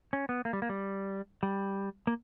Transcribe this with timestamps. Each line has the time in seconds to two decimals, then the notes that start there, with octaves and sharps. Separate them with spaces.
0.13 C#4
0.29 B3
0.45 A#3
0.53 G3
0.62 A#3
0.69 G3
1.43 G3
2.07 A#3